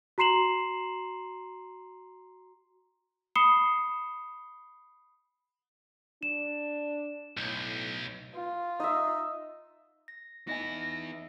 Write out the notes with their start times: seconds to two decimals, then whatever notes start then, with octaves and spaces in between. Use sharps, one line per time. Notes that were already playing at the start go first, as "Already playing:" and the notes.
0.18 F#4 A#5 C6 C7 E7 F#7
3.35 B5 D#6 C7 C#7 E7 G7
6.23 D4 E7
7.37 B1 A2 G6
8.34 F4
8.80 D#4 D#5 E5
10.08 A#6
10.47 B3 D#4 E4 D#5 G#5 A#6